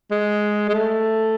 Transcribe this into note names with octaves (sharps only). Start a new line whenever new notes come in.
G#3
G#3
A3